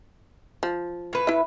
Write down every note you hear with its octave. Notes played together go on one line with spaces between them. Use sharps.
F3
A2 B4
E4 E5